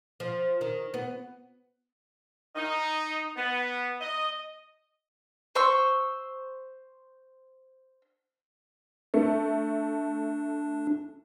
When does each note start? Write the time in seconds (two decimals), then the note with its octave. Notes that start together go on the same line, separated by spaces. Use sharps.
0.20 F3
0.61 D#3
0.94 B3
2.56 D#4
3.37 B3
4.01 D#5
5.55 C5 C#6 E6
9.14 A3 D4